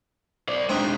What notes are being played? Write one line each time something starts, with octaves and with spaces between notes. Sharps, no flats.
C5 D5
G#3 C4 D4 D#4